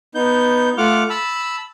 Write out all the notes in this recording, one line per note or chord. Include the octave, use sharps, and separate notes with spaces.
B3 D#4 G6
A3 F4 F#5 D6 F6
A5 B5 E6